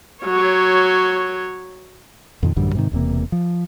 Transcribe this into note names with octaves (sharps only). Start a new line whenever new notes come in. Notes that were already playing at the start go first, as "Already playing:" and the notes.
F#3 C#5
F2 A#2 D#3 F3
A1 F#2 D3 G3
G#2 C3 D#3
E1 E2 C3 A#3
F3